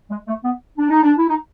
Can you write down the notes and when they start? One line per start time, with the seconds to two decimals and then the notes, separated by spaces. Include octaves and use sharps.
0.11 G#3
0.28 A3
0.44 B3
0.78 D4
0.90 D#4
1.03 D4
1.18 E4
1.28 D#4